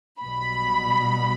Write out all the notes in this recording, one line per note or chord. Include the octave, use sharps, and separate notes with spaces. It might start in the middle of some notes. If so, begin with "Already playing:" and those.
B1 B2 G3 B5